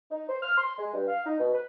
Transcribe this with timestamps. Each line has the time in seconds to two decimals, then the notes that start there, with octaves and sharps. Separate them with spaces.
0.11 D#4
0.29 C5
0.42 F6
0.58 C6
0.78 G#3
0.93 G2
1.08 F5
1.25 D#4
1.40 B2
1.53 B4